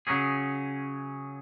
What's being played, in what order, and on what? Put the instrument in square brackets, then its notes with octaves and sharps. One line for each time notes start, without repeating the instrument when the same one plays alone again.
[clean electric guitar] C#3 F#3 C#4 G#4